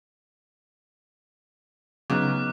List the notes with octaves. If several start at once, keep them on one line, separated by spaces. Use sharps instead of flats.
C#3 F#3 B3 D#4 D6 F6 F#6